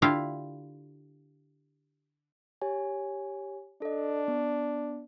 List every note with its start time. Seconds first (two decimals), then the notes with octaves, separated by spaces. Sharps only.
0.02 D3 E4 F4 G4 F5
2.62 G4 C#5 G#5
3.82 D4 A4 D#5
4.28 B3